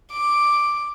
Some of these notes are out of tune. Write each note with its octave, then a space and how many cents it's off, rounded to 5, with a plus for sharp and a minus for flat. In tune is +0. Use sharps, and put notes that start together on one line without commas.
D6 +5